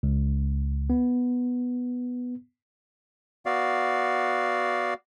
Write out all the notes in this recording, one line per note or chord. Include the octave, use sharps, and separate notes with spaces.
C#2
B3
B3 F#4 D5 F5